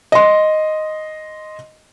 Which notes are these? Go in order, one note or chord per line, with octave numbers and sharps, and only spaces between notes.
D#5 C6